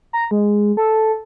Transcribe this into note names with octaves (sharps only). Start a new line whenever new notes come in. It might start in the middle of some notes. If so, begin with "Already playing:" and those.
A#5
G#3
A4